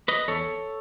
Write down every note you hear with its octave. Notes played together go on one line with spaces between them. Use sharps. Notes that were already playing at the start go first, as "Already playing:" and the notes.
B4 D#5
E2 A4 C#5